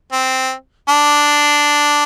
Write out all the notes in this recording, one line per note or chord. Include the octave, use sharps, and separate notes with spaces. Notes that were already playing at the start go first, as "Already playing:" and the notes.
C4
D4